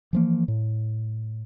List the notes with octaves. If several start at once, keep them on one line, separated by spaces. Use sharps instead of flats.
E3 F3 A#3
A2